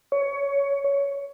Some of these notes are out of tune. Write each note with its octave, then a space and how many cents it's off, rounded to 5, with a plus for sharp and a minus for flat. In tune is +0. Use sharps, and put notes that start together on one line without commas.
C#5 +15